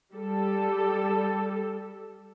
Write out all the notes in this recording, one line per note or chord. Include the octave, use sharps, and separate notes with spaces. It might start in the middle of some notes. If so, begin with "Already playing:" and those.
G3 A4